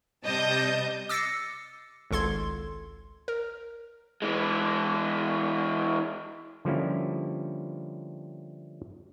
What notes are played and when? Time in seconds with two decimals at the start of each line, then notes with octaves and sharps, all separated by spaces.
0.25 C3 G3 D#5 A5 G6
1.09 D6 E6 A6 A#6 C7 C#7
2.11 G#1 C#2 A4 C6 G#6
3.28 A#4
4.22 E3 G#3
6.65 D3 F3 G3 A#3 C#4 E4